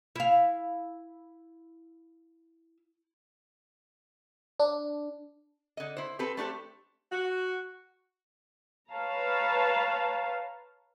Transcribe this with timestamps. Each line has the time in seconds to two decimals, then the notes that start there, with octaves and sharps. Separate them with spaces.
0.16 E4 F5
4.60 D4
5.77 D3 D#5
5.97 E4 C5
6.19 C4 G4 A4 B4
6.37 A3 D4 G4 A4 C5
7.12 F#4
8.90 B4 C#5 F5 A5 A#5